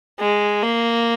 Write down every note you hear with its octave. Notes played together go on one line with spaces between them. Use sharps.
G#3
A#3